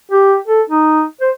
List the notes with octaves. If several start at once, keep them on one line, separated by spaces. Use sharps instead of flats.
G4
A4
D#4
C5